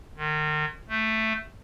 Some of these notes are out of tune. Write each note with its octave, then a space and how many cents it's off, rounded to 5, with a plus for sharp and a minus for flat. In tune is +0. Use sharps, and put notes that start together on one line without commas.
D#3 -35
A3 +5